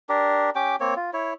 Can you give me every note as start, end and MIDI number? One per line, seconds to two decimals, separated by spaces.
0.09 0.50 62
0.09 0.50 67
0.09 0.50 70
0.55 0.76 61
0.55 0.76 67
0.55 0.76 79
0.55 0.76 86
0.80 0.94 58
0.80 0.94 60
0.80 0.94 73
0.96 1.11 65
1.13 1.33 64
1.13 1.33 73